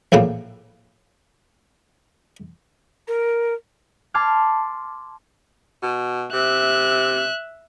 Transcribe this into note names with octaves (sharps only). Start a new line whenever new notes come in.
A#1 A2 C#3 A#3
A#4
A5 C6 D6 F6 G#6
B2
C3 E5 F#6